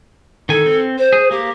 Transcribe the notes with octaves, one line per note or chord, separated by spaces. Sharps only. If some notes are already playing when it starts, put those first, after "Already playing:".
D#3 A4 G#5
C4
C5
G#4
A#3 G4